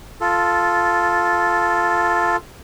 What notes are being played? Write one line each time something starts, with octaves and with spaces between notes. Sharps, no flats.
F4 A4